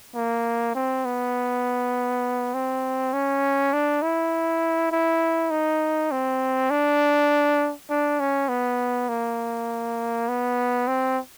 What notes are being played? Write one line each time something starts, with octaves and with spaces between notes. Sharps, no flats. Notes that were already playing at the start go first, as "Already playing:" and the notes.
A#3
C4
B3
C4
C#4
D4
E4
E4
D#4
C4
D4
D4
C#4
B3
A#3
B3
C4